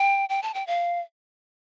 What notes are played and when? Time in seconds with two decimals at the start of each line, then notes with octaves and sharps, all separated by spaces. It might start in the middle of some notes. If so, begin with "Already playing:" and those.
Already playing: G5
0.29 G5
0.43 A5
0.54 G5
0.67 F5